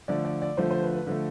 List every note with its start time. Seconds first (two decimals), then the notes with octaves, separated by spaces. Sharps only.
0.08 D3 F3 A3 D5
0.25 D5
0.42 D5
0.57 D3 F3 A3 C5
0.71 C5
0.82 B4
0.94 B4
1.07 D3 F3 A3